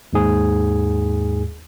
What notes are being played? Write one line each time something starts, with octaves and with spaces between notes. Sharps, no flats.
D#2 G#2 G#4